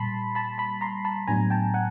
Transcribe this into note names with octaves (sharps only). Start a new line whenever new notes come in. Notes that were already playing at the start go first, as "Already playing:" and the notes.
Already playing: A#2 G3 A5 B5 C6
A5 B5
A5 B5
A#5 C6
A5 B5
A2 F#3 B3 D4 G#5 A#5
G5 A5
F#5 G#5